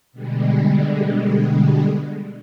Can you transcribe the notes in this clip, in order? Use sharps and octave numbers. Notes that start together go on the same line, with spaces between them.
B2 D3 G3 G#3